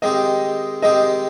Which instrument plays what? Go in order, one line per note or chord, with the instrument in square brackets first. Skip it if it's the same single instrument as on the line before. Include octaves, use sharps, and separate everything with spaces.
[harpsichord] D#3 G#3 C4 G4 [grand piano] D#5
[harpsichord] D#3 G#3 C4 G4 [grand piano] D#5